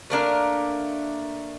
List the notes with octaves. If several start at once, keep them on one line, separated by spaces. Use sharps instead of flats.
A3 A#3 D4 A#4